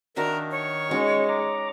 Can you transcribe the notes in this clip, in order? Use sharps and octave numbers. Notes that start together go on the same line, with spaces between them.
D#3 D4 F#4 A#4 E5
C#5
G#3 C#4 D#4 F#4
A#5 D6